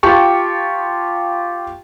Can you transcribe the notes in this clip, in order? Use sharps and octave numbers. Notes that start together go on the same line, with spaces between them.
F4 G4 G5 A5 C#6